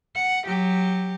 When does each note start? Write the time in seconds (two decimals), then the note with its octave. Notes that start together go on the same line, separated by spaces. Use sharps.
0.15 F#5
0.46 F#3 G4